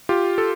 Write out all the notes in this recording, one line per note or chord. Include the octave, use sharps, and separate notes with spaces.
F4 G4
A4